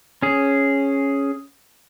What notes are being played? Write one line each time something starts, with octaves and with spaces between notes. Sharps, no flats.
C#4 G#4